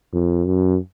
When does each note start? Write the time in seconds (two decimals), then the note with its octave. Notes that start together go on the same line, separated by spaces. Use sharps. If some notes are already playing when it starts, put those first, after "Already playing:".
0.13 F2
0.46 F#2